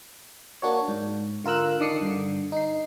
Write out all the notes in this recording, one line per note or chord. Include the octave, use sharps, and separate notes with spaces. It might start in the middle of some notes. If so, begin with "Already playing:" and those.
A#3 D4 F#4 C#5
G#2
D3 F4 A#4 E6 F#6
D#3 D4 D5 D#6 C7 C#7
G2 D3
D#4 C7